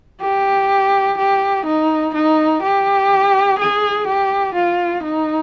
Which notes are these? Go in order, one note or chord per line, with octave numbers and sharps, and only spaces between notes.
G4
G4
D#4
D#4
G4
G#4
G4
F4
D#4